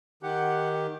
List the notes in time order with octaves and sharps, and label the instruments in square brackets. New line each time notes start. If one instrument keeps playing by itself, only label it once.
[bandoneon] D#3 G4 [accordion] F#5